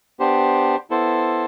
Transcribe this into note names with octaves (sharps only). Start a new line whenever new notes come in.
B3 D4 G4 C5
B3 E4 A4 C5